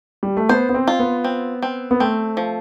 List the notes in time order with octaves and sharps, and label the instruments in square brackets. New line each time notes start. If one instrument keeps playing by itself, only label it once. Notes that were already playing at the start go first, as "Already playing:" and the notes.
[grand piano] G3
A3
[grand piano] B3 [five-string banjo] C5
[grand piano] B3
C4
[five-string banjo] F4
[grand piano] B3
[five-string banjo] C4
C4
[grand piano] B3
[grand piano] A3 [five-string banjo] C4
[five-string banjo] F3